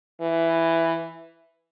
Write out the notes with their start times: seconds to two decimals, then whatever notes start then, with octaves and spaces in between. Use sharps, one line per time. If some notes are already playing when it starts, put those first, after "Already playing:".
0.21 E3